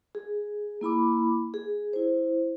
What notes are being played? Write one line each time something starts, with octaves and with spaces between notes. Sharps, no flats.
G#4
A#3 E4 B5 D6
G#4
E4 C5